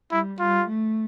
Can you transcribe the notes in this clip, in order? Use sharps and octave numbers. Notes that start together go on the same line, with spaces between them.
G3 E4
G3 F4
A3